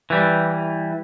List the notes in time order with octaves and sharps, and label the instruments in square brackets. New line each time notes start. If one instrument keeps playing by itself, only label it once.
[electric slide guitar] E3 G3